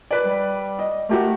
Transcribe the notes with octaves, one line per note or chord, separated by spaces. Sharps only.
B4 D5
G3
D#5
A3 F#4 G4 A#4